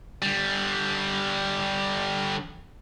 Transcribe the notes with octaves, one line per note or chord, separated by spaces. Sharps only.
D3 G3